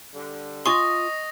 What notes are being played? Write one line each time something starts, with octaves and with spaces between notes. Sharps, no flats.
D3 G3
F4 D#5 G#5 C6 C#6 D#6 A#6